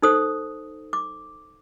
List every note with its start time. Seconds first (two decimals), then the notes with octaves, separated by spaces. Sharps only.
0.02 D#4 A4 C5 D#6
0.93 D6